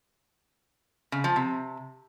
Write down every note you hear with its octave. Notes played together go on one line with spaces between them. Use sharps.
C#3
F3
C3